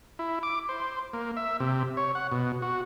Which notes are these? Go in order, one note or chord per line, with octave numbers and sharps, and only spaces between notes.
E4
D6
C5
A#3
E5
C3
C#5
F#5
B2
F#4